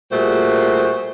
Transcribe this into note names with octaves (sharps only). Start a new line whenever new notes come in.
A#2 G3 A3 F#4 G#4 C5